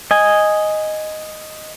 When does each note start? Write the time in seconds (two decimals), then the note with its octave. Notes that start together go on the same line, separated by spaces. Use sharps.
0.11 D#5 G#5